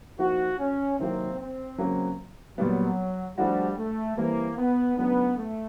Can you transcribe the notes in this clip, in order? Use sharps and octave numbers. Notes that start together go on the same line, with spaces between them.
F3 A#3 D#4 F#4
C#4
C3 D#3 F#3 A#3 C4
C4
C#3 F#3 A#3
A#2 F#3 G3 B3
F3 G3 A3 D4 F#4
A3
E3 G3 A#3 C4
B3
C#3 F#3 A3 B3 D4
A3